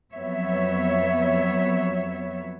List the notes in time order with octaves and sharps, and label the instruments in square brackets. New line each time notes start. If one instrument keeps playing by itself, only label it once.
[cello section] F2 F#3 B3 C#5 E5